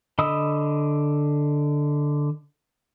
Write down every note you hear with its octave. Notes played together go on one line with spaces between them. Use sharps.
D3 D#5 B5 D#6 E6